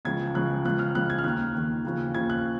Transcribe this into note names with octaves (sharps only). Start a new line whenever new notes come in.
C#2 C#3 F3 G#6
C#2 C#3 F3 F#6
C#2 C#3 F3 F#6
F6
C#2 C#3 F3 F#6
G#6
F6
D#2 D#3 F#6
D#2 D#3
D#2 C#3 F3
D#2 C#3 F3 G#6
F#6